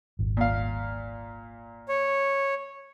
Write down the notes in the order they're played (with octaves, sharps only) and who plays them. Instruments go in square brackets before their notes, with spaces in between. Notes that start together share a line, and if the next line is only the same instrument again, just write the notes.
[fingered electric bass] D#1 G#1
[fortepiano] A#2 F5
[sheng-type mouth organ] C#5